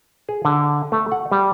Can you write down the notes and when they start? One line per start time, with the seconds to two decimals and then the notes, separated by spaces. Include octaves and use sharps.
0.29 G#4
0.45 D3
0.92 A3
1.12 F#5
1.32 G3